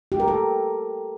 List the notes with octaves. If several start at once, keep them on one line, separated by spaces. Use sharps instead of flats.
G4
A#4
A4